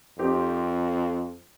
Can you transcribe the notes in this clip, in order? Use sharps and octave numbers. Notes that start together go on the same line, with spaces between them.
F2 C4 D#4 G4